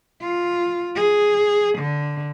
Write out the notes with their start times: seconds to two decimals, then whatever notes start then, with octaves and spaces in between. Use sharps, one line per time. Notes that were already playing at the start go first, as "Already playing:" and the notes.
0.21 F4
0.96 G#4
1.78 D3